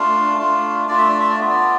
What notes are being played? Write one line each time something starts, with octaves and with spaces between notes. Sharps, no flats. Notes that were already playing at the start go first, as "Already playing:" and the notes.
Already playing: A3 D4 F4 F5
A3 D4 F4
A3 D4 F4 D5
E5
D5
E5
D5
B3 F4 E5
D5